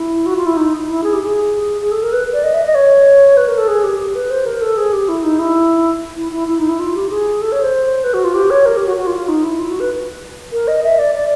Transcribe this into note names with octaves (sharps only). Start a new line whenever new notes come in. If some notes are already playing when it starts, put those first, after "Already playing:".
Already playing: E4
F#4
F4
E4
D#4
E4
G#4
G4
G#4
G#4
A4
A#4
B4
D5
D#5
E5
D#5
C#5
B4
A#4
A4
G#4
G4
G4
B4
C5
A#4
A4
G#4
G4
E4
D#4
E4
E4
E4
E4
D#4
E4
F4
G4
G#4
A4
C#5
C5
B4
F#4
F4
G4
C#5
A#4
G4
F#4
F#4
F4
F4
D#4
E4
F4
F#4
B4
A#4
D#5
E5
D5
D5